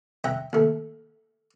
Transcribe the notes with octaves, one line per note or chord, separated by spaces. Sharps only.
E5 F#5 G5 A#5
D#2 A3